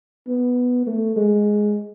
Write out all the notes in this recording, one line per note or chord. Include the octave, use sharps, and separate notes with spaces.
B3
A3
G#3